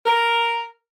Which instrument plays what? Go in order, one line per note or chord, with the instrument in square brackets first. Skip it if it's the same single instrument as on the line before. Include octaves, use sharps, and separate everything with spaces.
[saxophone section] A#4